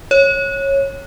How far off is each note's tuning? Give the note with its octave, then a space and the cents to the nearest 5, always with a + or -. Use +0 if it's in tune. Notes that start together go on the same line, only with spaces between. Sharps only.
C#5 -15